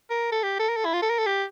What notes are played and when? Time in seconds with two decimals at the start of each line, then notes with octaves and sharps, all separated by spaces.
0.10 A#4
0.32 A4
0.43 G4
0.59 A4
0.69 A#4
0.76 A4
0.86 E4
0.94 F4
1.02 A4
1.10 A#4
1.18 A4
1.27 G4